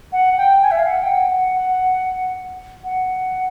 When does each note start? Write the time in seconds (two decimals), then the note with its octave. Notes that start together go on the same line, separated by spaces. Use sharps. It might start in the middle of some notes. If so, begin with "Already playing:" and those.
0.12 F#5
0.37 G5
0.62 G#5
0.71 E5
0.79 F5
0.87 F#5
1.03 G5
1.12 F#5
2.84 F#5